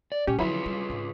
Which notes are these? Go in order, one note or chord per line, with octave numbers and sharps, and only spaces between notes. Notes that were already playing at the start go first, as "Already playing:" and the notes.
D5
A#2 G#3 C#4 G4
D3 F3 F#3 E4 F4 G#4 B4
G3
G#2 C#3